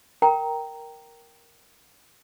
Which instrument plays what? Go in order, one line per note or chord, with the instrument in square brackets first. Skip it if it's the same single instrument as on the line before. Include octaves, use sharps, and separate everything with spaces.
[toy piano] A#4 G5 A#5